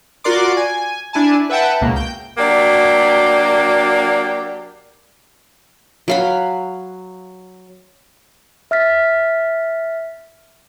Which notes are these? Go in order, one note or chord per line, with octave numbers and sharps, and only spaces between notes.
F4 F#4 A#4 D5 C6 D6
G#5
D4 E4 G#5 A5
B4 E5 F#5 G5 A5
C#2 B2 A#3
G5 G6
F#3 A#3 D4 F#4 G4
F#3 F5 B5
E5 F6 A6 B6